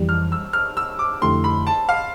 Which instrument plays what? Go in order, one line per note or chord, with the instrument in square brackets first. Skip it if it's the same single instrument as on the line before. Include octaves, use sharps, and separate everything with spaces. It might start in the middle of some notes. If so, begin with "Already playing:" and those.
Already playing: [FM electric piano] F2 E3 G3
[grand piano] F6
E6
F6
E6
D6
[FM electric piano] F2 D3 A3 E4 G4 [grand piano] C6
[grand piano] B5
A5
F5